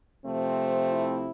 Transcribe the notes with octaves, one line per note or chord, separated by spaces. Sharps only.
C3 F3 A3 C4
E4